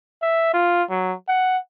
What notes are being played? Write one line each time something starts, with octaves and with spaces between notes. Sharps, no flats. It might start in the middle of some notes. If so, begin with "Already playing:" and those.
E5
F4
F#3
F#5